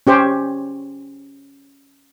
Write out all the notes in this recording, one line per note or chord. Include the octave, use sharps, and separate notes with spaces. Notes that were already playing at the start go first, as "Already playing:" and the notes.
C#4 G4 C5 C#5